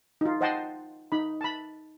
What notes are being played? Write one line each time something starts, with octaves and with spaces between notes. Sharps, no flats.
D#4 F4
C5 D#5 F#5 G5 A5 C6
D#4 B5
A5 B5